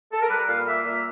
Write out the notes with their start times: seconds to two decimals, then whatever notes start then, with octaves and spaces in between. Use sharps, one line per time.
0.12 A4
0.21 A#4
0.28 G3 B4
0.47 A#2 F5
0.66 A#3 E5
0.85 A#2 E5